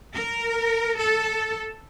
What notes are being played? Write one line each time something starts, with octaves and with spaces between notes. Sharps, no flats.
A#4
A4